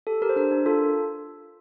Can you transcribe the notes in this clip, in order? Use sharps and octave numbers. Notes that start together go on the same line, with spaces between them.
G4 A4
G4 A#4
C5
D4 A#4
D4
F4 A4